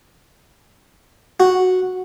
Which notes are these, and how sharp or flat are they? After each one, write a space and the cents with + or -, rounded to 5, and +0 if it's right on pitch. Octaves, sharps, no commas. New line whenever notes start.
F#4 -5